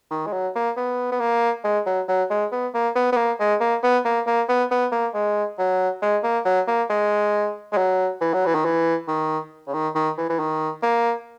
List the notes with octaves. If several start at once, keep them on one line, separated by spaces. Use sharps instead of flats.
D#3
G#3
F#3
A#3
B3
B3
A#3
G#3
F#3
F#3
G#3
B3
A#3
B3
B3
A#3
G#3
A#3
B3
A#3
A#3
B3
B3
A#3
G#3
F#3
G#3
A#3
F#3
A#3
G#3
G#3
F#3
E3
F#3
E3
D#3
E3
D#3
C#3
D#3
D#3
E3
E3
D#3
A#3